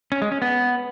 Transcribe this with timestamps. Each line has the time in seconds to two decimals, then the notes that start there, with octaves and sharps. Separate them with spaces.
0.12 C#4
0.22 G#3
0.32 C#4
0.42 B3